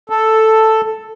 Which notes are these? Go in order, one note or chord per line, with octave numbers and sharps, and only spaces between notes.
A4